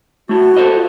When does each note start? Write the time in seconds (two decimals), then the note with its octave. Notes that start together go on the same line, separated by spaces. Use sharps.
0.29 A3 E4 F#4
0.57 A4 C5 D#5
0.75 F4